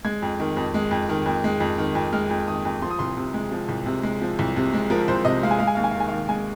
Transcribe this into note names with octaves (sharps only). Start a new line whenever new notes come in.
G#3 G#6
F2
D#3
F2
G#3
F2
D#3
F2
G#3
F2
D#3
F2
G#3 F6
F2
D#3 D#6
F2
F3 C6
D#6
C2 C6
C3
G#3
F3
C2
C3
G#3
F3
C2
C3
G#3
F3 A#4
C2 C5
C3 D#5
G#3 F5
G#5
G#3 F5
G#5
D#2 F5
G#5
F5
D#3
G#5
D#2 F5
G#3 G#5